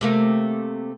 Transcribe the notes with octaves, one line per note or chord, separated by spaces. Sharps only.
C3 A3 A#3